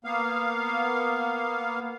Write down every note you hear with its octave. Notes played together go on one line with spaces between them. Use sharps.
A#3 B3 F5